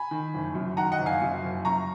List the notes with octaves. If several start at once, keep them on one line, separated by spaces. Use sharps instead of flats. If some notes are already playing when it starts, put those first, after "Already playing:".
Already playing: G#5 B5
D#3
F#1
F#2
D#3 F#5 A#5
D#5 F#5
F#1
F5 G#5
F#2
F#1
F#2 A#5 C#6